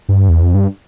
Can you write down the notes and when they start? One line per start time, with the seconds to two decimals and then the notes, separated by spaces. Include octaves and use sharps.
0.09 G2
0.29 E2
0.42 F2
0.54 G2